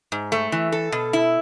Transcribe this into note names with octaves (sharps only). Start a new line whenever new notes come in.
G#2
A3
E3
A4
B2
E4